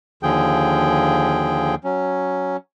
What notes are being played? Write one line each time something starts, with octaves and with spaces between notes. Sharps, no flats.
D#2 D3 F3 G#4 G5
F#3 C#4